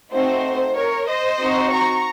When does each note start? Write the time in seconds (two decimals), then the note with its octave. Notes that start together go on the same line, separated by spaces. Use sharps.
0.11 A3 C4 D#4 F#4 C5
0.75 A#4 C#5
1.08 C5 D#5
1.40 C4 D#4 F#4
1.71 A#5 C#6